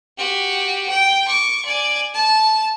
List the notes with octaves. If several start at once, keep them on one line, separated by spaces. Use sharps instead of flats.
F#4 G4
G5
C#6 D6
D5 G#5
A5